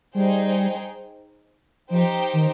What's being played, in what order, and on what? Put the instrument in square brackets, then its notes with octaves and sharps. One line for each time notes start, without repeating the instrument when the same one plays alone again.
[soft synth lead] G3 [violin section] D#4 G#4 C5 G5
[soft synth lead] F3 [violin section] D#4 G4 C5 G5
[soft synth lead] D#3